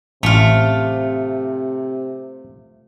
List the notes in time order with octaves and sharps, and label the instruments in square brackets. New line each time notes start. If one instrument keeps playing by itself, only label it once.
[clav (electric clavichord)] A1 [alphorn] C3 [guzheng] A3 F4